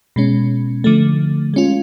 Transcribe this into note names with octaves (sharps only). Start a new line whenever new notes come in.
B2 G#3 C#4
D3 F3 A3
G#3 C#4 F4